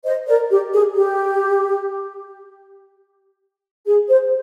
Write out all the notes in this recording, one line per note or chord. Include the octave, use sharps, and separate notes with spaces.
C5 D#5
A#4 D5
G4
G#4
G4
G#4
C5